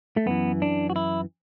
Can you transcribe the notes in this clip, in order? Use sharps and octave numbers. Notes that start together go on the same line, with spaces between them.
A3
F#2 E3 B3
D4
F#4
E4